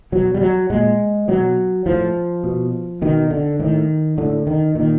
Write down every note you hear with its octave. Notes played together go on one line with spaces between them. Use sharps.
B2 F#3
G3
F#3
A#2 G#3
B2 F#3
A2 F3
B2
B2 D#3
D3
A2 D#3
A2 D3
D#3
A#2 D#3